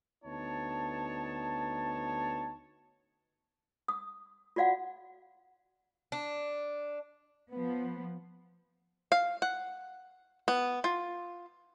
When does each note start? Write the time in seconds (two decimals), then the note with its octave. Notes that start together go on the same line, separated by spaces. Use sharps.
0.24 D2 B3 D#4 C#5 A5
3.88 D#6
4.56 F4 F#4 D5 F5 F#5
6.12 D4
7.51 F3 B3
9.12 F5
9.42 F#5
10.48 B3
10.84 F4